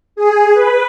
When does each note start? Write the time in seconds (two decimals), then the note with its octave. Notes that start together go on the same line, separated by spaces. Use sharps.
0.16 G#4
0.54 B4